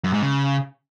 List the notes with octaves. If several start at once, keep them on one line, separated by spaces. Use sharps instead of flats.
F#2
G#2
C#3